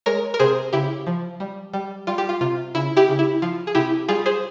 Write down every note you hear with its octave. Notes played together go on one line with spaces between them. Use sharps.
G#3 A#4 C#5
A#4
C3 G#4 C5
C#3 E4 G4
F3
G3
G3
G3 F4
G4
F4
C3 F4
C#3 E4
E4 G4
C#3
E4
F3 F4
G#4
C3 E4 G4
G3 F4 G#4
G#4 C5